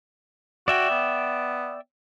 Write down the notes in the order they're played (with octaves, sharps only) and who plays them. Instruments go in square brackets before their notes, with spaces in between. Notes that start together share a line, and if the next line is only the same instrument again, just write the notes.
[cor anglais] F#4 [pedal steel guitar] D5 E5 G5
[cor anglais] B3